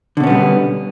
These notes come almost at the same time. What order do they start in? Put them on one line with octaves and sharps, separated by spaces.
D3 B2 C#4 B3 G3